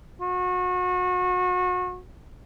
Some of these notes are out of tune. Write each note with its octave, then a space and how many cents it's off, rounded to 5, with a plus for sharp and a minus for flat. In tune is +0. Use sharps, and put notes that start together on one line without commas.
F#4 -30